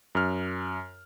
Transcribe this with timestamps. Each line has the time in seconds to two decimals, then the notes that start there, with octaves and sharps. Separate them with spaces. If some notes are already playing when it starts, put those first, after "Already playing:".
0.15 F#2 F6